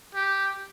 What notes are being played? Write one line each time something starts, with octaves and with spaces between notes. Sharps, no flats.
G4